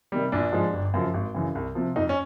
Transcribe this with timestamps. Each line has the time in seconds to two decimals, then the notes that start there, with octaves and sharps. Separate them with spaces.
0.12 C3 D#3 G3
0.32 A#1 D4
0.52 G#2 F3 G#3
0.73 G1
0.94 F#2 C#3 F3
1.14 G#1
1.34 F#2 C#3 E3
1.55 C2
1.75 C3 F3
1.96 F2 D#4
2.09 C#4